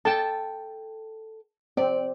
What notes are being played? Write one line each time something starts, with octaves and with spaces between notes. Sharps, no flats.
A4 G5 A5
C4 D5